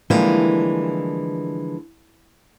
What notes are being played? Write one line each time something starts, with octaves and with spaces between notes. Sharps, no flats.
D3 E3 F3 G3 G#3 A#3